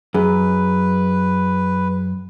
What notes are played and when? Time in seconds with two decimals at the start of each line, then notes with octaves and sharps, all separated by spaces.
0.14 F#2 G#4 B4